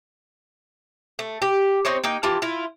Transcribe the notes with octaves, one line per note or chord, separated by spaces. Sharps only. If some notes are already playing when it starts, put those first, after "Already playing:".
A3
G4
C4 D#4 C5 C#5
A#3 D#4 G5
E3 F4 G4 A5
E4 F4